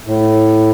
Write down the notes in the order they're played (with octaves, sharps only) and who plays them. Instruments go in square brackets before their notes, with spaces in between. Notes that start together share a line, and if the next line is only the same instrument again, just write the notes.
[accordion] A2